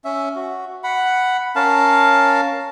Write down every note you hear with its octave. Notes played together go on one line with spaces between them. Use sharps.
C#4 E5
F#4
F#5 B5
C#4 A#4 F5 A5